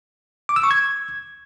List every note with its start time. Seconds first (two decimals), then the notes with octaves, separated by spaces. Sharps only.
0.49 D6
0.56 E6
0.63 C#6
0.71 G#6